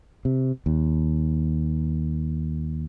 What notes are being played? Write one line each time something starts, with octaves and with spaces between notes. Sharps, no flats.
C3
D#2